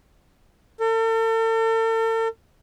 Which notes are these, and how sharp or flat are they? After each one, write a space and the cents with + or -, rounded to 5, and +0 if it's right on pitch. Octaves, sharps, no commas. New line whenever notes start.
A4 +40